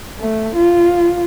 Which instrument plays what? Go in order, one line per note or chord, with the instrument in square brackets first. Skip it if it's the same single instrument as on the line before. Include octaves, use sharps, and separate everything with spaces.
[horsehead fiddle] A3
F4